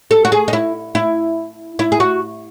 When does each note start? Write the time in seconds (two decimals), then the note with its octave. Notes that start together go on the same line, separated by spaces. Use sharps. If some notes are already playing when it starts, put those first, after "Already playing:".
0.11 A4
0.25 F#4
0.32 G#4
0.48 D#4
0.53 E4
0.95 E4
1.79 E4
1.92 G#4
2.00 F#4